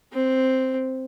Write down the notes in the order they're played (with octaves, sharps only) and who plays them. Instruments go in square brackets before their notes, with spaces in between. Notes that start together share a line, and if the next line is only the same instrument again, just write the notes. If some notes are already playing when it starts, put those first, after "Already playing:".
[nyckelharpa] C4